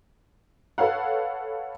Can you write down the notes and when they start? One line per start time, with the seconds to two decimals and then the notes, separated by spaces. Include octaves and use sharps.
0.78 A4 B4 C#5 F5 F#5